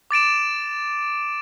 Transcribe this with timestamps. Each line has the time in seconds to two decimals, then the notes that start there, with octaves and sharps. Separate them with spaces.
0.11 D6 A6 D7 E7